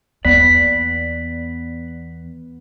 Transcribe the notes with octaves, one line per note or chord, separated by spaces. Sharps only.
E2 B3 D5 B6